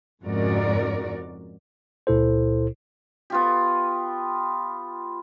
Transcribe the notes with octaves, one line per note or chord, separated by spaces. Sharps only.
F2 G#2 C#3 F#4 A#4 D5
C#2 A#2 E4 A4 C5
B3 F4 G4